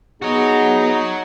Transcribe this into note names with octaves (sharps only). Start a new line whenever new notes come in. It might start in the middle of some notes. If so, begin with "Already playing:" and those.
B3 D#4 F#4 G#4 C#5